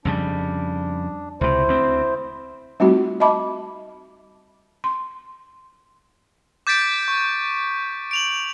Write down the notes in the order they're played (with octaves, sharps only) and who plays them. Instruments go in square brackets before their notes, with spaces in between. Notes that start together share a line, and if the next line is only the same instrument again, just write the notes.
[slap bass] F2 C#3 G3 [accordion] D4
[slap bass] C#2 C3 [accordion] E4 C5
[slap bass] D2 C4
[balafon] G3 A3 C4 D#4 F4 F#4
D#5 E5 A5 B5 D6
C6
[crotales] D6 G6 A6 B6 D7
C#6
D7 F7 F#7